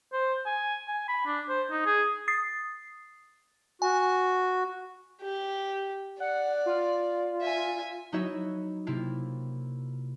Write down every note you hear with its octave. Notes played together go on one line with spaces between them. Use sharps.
C5
G#5
G#5
B5
D4
C5
D#4
G#4
D#6 A6 C7
F#4 G#5
G4
D5 F#5
F4
E5 G#5
F#3 D#4 E4 F#4 C#5 E5
C3 A#3 E4 F4